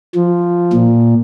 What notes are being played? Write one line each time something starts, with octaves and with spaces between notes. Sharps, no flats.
F3
A#2